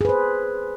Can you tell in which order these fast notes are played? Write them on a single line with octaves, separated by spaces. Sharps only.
G#4 B4 C5